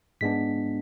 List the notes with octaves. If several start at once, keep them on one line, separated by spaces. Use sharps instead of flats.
G#2 G#3 B3 D4 B6